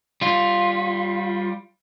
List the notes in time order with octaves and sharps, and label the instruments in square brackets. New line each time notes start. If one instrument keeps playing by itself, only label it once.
[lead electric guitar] G3 F4